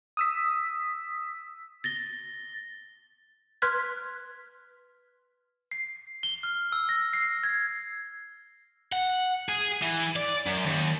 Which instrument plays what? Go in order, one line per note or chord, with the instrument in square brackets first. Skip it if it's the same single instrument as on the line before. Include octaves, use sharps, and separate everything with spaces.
[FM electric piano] D#6 E6 B6
[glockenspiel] A6 A#6 G7
[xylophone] B4 C6 F6 F#6 G#6 B6
[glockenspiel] C7
G7
F6
E6
A#6
C7
G#6
[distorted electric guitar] F#5
G#4
E3
D5
F#2
D#2